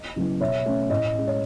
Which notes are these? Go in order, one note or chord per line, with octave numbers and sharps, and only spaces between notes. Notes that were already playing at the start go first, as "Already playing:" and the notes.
Already playing: D#5
C#3 F#3 B3 E4
B2 C#5 E5
A3 C#4
A2 D#5
G#3 C#4
C#5